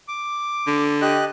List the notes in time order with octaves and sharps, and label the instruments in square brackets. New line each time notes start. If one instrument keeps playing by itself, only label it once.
[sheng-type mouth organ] D6
[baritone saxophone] D3
[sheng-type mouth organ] G4 D#5 F#6